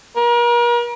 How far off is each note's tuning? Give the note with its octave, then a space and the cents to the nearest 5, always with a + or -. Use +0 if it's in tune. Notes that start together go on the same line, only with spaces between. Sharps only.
A#4 +40